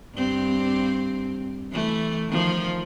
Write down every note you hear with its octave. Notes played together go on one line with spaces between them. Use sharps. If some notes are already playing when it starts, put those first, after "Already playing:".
G2 C4
E3 A3
D#3 F3